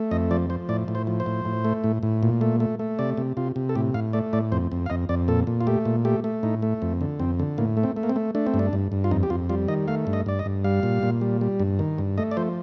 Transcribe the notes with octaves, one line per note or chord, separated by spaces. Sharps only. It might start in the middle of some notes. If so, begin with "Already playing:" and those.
Already playing: A3
F2 D#5
F3 D5
F3 C5
A2 D5
A2
C5
F3
C5
A2
A2
A3
A2
A2
A#2
A3
A3
A3
C3 D5
C3
C3 F4
C3
A4
A2 G4
A2 F5
A3 D5
A2 D5
F2 C5
F2
F5
F2 D#5
F2 D5
A#2 A4
A#2
F4
A3 G4
A#2
A3 G4
A3
A2 D#4
A3
F2
D3
F2 C4
D3
A2 A#3
A3
C4
A3
A#3
C4
A3
A3 D4
C4
G2
D4
G2
G2
F4
F2 D#4
G4
F2 F4
G3 F4
D#3 D#5
A3 F5
G2
D#5
G2 D5
D#5
G2
G3 F5
A#2
A#2
G3
G3
G2
D#3
G2
A3 D#5
D5
F3 C5